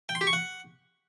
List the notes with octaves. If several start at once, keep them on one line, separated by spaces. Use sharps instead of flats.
G5
C6
G4
C#6
F#5